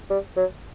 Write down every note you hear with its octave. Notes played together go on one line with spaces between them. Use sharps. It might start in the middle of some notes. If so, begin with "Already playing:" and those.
G3
F#3